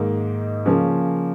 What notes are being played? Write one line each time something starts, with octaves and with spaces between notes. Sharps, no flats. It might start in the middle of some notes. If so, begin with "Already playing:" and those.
Already playing: G#2 D#3 A#3 D#4
C#3 F3 A#3 C#4